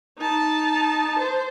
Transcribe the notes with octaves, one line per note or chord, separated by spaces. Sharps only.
D#4 A5
C5